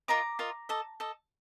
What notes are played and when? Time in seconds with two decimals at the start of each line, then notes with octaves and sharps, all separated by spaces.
0.08 F4 A#4 D#5 A#5 D6
0.39 F4 A#4 D#5
0.69 A4 D#5
1.00 A4 D#5